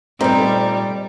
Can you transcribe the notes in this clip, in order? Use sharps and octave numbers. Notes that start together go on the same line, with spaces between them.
A#2 G3 A3 C4 D#4